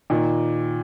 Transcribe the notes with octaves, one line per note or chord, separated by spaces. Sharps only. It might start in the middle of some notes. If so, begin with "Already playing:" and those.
A#2 D#3